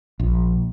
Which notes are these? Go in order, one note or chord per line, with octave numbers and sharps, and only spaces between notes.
A#1